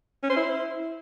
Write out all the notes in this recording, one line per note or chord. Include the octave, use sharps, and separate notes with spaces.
C#4
C5
E4